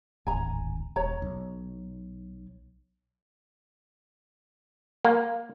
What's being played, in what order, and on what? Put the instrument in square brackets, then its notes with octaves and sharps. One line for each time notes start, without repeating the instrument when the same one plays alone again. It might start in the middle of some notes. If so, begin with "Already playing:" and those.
[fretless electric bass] D1 G#1 [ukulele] G#5 A#5
[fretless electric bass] D#1 [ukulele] C#5 A#5
[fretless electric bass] B1
[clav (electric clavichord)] A#3